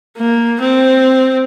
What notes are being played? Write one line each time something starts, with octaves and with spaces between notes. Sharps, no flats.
A#3
C4